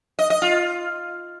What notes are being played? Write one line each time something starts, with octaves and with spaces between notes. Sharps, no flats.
D#5
D#5
F4